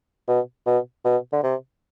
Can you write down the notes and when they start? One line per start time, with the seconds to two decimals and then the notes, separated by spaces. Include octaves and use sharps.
0.28 B2
0.66 B2
1.05 B2
1.32 D3
1.43 C3